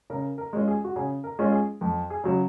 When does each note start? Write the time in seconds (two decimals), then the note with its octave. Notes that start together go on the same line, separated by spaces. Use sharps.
0.10 C#3 A#4
0.38 A#4
0.53 G#3 C#4 F4
0.68 G#4
0.84 F#4
0.96 C#3 G#4
1.24 A#4
1.39 G#3 C#4 F4
1.52 G#4
1.81 F2
2.10 G#4
2.24 C#3 F#3